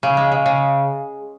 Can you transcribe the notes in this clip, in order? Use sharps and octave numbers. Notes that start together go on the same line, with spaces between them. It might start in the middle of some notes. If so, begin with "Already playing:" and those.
C#3
G#3
C#3
C#3